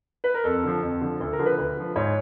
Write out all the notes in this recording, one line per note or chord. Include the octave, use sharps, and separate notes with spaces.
B4
A#4
F2 A4
D3 F3
F2
D3 F3
D2 A4
A#4
D3 F3
B4
D2
D3 F3
G#2 C#5